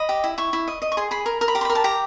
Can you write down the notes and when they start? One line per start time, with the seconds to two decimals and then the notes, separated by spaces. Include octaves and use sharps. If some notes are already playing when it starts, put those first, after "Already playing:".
Already playing: D#5 B5
0.09 G4
0.24 E4
0.38 E4 C#6
0.53 E4
0.68 D#5
0.82 D#5
0.92 C#6
0.97 G#4 C6
1.11 G#4 B5
1.26 A#4
1.41 A#4
1.48 B5
1.55 G4 A#5
1.61 C6
1.65 A#4 B5
1.75 A5
1.84 G4 A#5